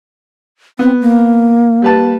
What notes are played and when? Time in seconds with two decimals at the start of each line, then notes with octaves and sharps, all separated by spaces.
0.79 B3 C4
1.01 A#3
1.82 G3 B4 A5